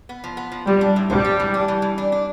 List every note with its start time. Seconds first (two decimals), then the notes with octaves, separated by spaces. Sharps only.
0.09 B3
0.24 F3
0.37 B3
0.52 F3
0.66 F3 G3
0.81 D4
0.96 A2
1.10 G3 D4
1.25 G4
1.40 E3
1.54 D4
1.68 E3
1.82 E3
1.98 D4
2.12 D4